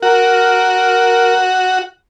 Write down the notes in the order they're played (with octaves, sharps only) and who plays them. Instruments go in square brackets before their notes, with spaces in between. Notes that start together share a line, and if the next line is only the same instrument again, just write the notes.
[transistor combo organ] F#4 [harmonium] A#4